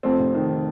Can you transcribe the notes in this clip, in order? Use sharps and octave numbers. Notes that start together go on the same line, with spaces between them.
F2 A3 C4
F1
D#3